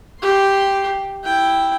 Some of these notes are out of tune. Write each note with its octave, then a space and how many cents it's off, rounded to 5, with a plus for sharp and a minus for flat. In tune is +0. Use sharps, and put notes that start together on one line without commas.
G4 +0 C6 +0
E4 +0 G5 +0